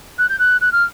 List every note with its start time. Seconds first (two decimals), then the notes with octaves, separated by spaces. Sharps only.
0.18 F#6
0.29 G6
0.39 F#6
0.61 F#6
0.72 F6